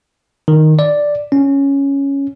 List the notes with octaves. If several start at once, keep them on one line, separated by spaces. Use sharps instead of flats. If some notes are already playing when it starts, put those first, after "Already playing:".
D#3
D5
C#4